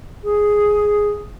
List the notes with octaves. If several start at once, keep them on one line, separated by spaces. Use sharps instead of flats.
G#4